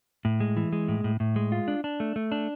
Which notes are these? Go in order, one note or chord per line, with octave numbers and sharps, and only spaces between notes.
A2
G#3
E3
G#3
A2
A2
A2
G#3
F4
D4
D4
A3
A3
D4